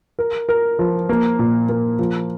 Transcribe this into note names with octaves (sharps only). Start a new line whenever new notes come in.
A#4
A#4
F3
A#3
A#2
A#3
F3